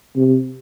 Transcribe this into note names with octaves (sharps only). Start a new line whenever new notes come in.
C3